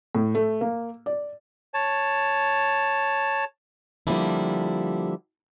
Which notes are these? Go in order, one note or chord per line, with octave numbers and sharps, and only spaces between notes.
A2
A3
A#3
D5
C#5 A5
D3 F3 G3 A#3 D4 E4